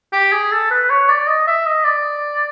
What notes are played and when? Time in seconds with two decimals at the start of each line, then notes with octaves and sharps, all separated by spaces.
0.13 G4
0.32 G#4
0.52 A4
0.71 B4
0.90 C#5
1.09 D5
1.27 D#5
1.47 E5
1.66 D#5
1.84 D5